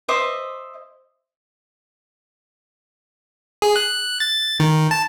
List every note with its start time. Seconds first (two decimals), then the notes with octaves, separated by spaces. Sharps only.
0.09 C5 D#5 E5 D6
3.62 G#4
3.76 F#6
4.20 A6
4.60 D#3
4.91 A5